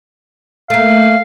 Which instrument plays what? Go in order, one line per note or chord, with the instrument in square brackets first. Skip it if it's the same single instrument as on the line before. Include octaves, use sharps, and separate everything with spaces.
[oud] A3 A#3 [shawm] F5